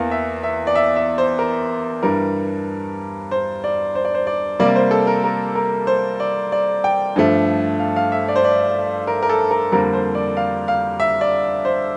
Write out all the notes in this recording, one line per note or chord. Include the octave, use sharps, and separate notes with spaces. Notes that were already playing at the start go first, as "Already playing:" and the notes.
Already playing: E2 E3 A#3 F5
E5
E5
D5
E5
E5
C5
A#4
G2 E3 G3 A#4
C5
D5
C5
D5
C5
D5
C3 G3 A#3 D5
C5
A4
A#4
A#4
A#4
C5
D5
D5
G5
G2 F3 A3
F5
F5
E5
D5
C5
D5
A#4
A#4
A4
A#4
F2 D3 G3 A#3 A#4
C5
D5
F5
F5
E5
D5
C5